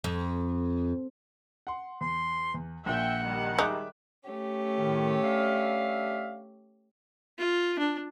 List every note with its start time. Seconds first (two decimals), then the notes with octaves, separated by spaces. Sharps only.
0.04 F2
1.67 F#5 C6
2.01 E2 C6
2.54 E2
2.86 A#1 A#2 E5 F#5 G5
3.24 D#3 G3
3.59 G#3 D#4 E5 D6 F#6
4.28 A3 C#4 G4
4.78 F#2 A2 D#3
5.24 D4 E5 F5
7.39 F4
7.79 D4